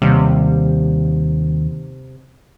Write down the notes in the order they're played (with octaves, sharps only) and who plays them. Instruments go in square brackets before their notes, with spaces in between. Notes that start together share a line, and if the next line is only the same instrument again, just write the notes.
[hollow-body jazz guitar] D#2 G3 [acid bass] C3